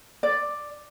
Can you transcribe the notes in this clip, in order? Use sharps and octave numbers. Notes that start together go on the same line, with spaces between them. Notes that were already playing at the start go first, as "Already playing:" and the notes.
D5